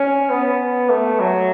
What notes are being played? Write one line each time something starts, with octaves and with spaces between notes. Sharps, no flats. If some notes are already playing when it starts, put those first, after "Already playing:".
Already playing: C#4
B3
A3
F#3